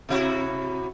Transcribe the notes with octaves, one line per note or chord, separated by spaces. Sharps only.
C3 E4 F#4